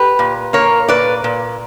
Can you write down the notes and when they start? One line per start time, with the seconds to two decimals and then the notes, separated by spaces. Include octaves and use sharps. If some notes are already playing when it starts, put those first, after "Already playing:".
Already playing: G4 B4
0.19 A#2
0.53 A#3 A#4 C#5
0.89 A#2 B4 D5
1.24 A#2